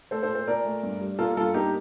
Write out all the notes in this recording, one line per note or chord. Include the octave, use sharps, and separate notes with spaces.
A3 A4 C5
A4 C5
A#2
A4 C5
A#2 A#4 D5
A3
G2
G3
A#3 F4 A4
G2 F4 A4
A#3 D#4 G4